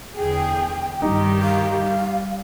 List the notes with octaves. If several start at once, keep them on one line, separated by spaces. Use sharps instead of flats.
E2 D3 G#4 G5
G2 D#3 G3 D#4 G4
G3 F5